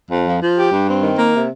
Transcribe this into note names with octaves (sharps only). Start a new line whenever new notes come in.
F2
F3
F3
G4
G2
C4
D#3
A#3
C3